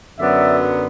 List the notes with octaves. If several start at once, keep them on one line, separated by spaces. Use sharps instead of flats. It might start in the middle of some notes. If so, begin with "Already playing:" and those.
F#2 D3 F#3 B3 D5 E5